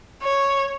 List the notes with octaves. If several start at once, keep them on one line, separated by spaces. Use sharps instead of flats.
C#5